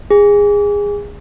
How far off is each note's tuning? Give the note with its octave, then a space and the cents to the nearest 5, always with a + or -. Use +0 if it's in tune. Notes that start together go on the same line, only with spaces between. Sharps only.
G#4 -20